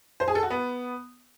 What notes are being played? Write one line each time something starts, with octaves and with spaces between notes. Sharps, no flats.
C5
G#4
A4
F#4
B3